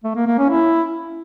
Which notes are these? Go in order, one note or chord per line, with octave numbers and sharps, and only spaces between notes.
A3
A#3
A#3
C#4
E4